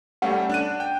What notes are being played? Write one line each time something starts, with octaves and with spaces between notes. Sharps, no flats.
G3 A3 C#4 F#5
D4 F#6 D#7
G5